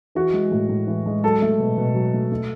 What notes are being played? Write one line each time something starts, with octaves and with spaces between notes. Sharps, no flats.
E3 F#4
G#3
A2
A2
E3
G#3
F#3 A4
A3
B2
B2
F#3
A3
A3